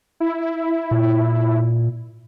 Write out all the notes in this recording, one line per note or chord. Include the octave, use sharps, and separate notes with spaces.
E4
A#2